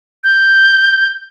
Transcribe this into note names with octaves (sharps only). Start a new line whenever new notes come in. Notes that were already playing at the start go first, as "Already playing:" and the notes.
G6